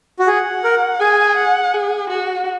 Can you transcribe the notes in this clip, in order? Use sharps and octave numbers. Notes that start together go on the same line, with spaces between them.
F#4
G#4 F#5
A#4
G#4 G#5
F#5
G#4
F#4